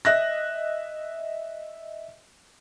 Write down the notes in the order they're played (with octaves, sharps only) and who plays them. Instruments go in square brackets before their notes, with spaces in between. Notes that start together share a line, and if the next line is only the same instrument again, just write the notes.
[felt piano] D#5 E5 F#6 A#6